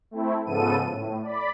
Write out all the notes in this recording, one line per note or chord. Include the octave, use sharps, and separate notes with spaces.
A3 C4 E4
G#2 C#3 F3 B3 A4 D#7
A2
D5 B5